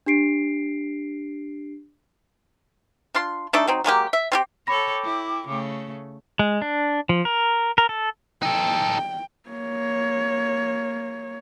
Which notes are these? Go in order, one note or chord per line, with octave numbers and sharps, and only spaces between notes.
D4 G4 C7 D7
D4 F4 C6
A3 D4 D#4 A4
F#3 C4 D#4
F#3 G#3 A#3 G4
E5
C4 E4 G4
A4 C#5 G5 B5 D6 A#6
E4
C#3 A3
G#3
D4
F3
A#4
A#4
A4
D#4 A4 G5
A#3 C#5